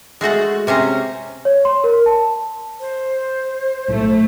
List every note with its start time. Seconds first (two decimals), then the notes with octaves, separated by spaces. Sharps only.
0.21 G#3 A3 F#4 F#5
0.67 C3 C#4 C5 A#5
1.45 C#5
1.65 C6
1.84 A#4
2.06 A5
2.80 C5
3.89 B1 A2 A3